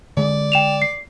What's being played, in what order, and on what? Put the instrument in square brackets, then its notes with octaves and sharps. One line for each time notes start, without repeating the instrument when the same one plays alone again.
[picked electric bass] D3 G#3 [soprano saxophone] D5
[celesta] G5 E7 F7
C7